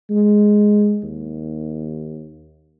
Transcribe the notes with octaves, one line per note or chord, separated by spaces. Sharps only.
G#3
D#2